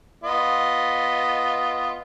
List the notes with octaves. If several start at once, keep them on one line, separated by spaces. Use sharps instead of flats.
B3 F4 D#5